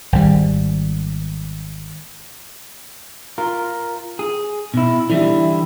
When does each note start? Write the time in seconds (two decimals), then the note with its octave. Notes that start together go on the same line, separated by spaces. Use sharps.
0.12 G#1 G3
3.38 F4 A#4
4.19 G#4
4.74 B2 E4
5.10 D3 E3 G3 E4